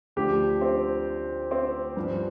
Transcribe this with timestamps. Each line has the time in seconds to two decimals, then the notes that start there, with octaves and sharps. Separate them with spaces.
0.16 D2 D3 F3 G4
0.61 C4
1.51 C4
1.96 G2 F3